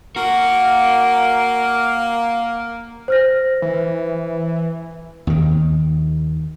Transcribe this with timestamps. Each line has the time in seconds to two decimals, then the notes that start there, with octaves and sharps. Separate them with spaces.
0.16 A#3 F#4
3.08 C5 F6 A#6
3.62 E3
5.27 D#2 D#3